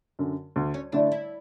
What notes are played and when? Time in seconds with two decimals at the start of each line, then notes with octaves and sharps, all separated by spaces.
0.19 F#2 D3
0.56 D2
0.74 C#4
0.92 D3 A3 D4 E4
1.12 E4